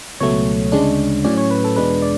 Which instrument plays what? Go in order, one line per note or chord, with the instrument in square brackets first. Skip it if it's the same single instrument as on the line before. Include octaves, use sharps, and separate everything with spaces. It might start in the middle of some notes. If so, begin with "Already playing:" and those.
[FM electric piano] C#2 B2 F#3 A3 C#5
D2 C#3 G#3 D4
A2 F#3 C#4 D5
C#5
B4
A4
E2 B2 G#3 D4 B4
D5